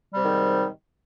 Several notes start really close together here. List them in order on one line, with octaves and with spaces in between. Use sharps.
G3 C3 D#3 G#2